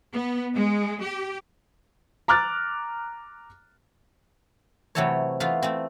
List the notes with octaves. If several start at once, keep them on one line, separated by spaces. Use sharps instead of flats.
B3
G#3
G4
A#5 D6 F6 F#6 A6
C3 E3 F#3 A3 A4 C#5
E3 A3 B3 F4 F5
A3 C4